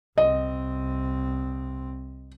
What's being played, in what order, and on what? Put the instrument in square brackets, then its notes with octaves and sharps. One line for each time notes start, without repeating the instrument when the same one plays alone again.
[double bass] C2 C4 [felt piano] D#5